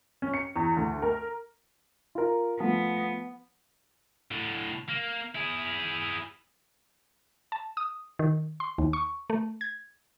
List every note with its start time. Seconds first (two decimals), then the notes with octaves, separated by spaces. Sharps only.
0.22 C#4
0.34 C#7
0.56 E2
0.77 D2
1.02 A#4
2.15 F4 A#4
2.60 F3 A3 B3
4.31 A2 D3
4.89 A#3
5.35 E4 G#4
7.52 A5
7.77 D#6
8.19 D#3
8.60 C6
8.78 D#2
8.93 C#6
9.30 A3
9.61 G#6